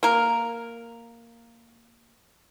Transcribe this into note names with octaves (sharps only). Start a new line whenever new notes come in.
A#3 A#4